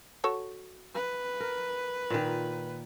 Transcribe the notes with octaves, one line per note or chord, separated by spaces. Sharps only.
F#4 A4 C#5
B4
A#4
A#2 D#3